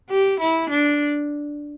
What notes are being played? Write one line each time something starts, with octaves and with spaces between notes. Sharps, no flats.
G4
E4
D4